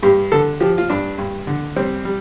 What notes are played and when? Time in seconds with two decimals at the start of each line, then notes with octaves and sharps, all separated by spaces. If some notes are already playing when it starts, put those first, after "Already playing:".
0.03 G2 G4
0.32 D3 A4
0.60 F3 G4
0.78 F4
0.90 G2 D4
1.18 G2
1.47 D3
1.76 G3 C4
2.05 G3